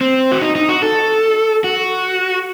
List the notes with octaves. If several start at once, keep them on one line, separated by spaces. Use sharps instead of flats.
C4
F#4
D#4
D#4
F#4
A4
F#4